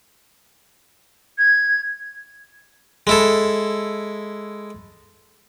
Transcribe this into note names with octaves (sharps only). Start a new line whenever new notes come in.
G#6
G#3 E4 A4